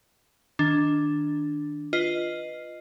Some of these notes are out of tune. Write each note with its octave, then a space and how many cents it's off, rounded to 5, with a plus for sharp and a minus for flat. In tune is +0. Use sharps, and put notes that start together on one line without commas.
D#3 +0 D4 +0
F4 +0 B4 +0 D#5 -5